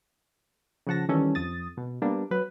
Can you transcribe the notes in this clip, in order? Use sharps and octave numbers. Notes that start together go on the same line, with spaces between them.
C#3 F3 F#5 A5 A#6
D#3 E3 G3 C#4 A4
F2 D#6 A6
B2
G3 A#3 B3 D4
F#3 B4